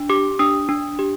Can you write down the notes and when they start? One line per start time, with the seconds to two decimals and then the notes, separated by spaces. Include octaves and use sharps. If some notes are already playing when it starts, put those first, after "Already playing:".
Already playing: D4
0.10 G4 D6
0.39 D4 D#6
0.69 D4
0.99 G4